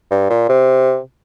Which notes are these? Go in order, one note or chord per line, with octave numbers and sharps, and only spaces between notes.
G2
A#2
C3